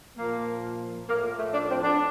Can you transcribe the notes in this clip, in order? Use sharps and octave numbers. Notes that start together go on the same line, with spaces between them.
A#2 F3 A#3
A2 F3 A#3
A3
D4
C4
D4